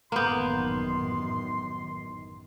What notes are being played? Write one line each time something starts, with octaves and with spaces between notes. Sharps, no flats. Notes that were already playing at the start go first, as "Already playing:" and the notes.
A1 F#2 D#3 A#3 B3 A#5 C6 G6